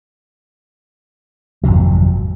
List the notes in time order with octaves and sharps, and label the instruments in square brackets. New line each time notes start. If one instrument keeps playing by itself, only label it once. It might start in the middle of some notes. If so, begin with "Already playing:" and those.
[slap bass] G#1 F2 C3 F#3